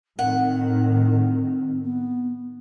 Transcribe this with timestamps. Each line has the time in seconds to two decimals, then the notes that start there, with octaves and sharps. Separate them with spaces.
0.19 A2 D#3 C4 F#5
1.83 B3